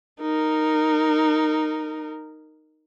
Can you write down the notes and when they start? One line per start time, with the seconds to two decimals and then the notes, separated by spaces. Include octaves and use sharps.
0.21 D#4 A#4